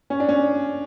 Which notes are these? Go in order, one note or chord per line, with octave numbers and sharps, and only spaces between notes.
C#4
D4
C#4